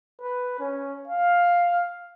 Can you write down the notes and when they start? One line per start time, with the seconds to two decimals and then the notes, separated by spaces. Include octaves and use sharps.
0.21 B4
0.60 C#4
1.08 F5